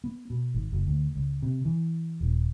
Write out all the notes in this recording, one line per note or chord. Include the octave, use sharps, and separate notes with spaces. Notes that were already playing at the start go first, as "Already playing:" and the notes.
B3
B2
G#1
F#1
D2
C#2
C3
E3
D#1